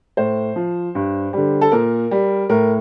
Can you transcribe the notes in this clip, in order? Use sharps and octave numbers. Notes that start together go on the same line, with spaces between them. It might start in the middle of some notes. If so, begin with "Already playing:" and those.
A2 C5
F3
G2
D3 G3
A4
A#2 A#4
G3
A2 A#4